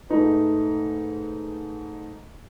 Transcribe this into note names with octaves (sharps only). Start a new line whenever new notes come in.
G#2 A3 D#4 B4